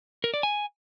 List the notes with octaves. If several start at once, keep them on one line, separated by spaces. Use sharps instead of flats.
A#4
D5
G#5